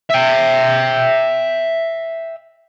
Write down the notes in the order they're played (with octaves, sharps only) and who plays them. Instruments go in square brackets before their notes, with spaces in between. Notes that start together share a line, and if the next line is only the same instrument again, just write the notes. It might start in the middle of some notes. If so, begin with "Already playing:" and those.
[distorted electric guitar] E5 G5